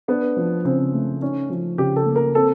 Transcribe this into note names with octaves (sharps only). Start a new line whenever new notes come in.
B3 D4
F3
C#3 C4
A3
C#4 D#4
F3
C#3 G4
A4
A#3
A#4
C4 A4